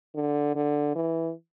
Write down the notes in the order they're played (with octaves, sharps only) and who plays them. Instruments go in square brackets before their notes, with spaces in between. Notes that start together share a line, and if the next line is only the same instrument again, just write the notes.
[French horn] D3
D3
E3